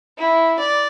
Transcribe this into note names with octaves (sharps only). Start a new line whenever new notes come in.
E4
D5